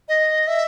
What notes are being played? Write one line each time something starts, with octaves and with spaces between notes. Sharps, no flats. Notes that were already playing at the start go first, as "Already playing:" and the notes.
D#5
E5